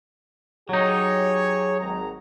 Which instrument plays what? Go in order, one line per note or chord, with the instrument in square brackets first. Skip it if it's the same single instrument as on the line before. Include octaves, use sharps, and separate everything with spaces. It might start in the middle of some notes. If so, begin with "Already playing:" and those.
[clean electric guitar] F#3 D#4 [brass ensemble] G4 G#4 C#5
[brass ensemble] G#1 A#5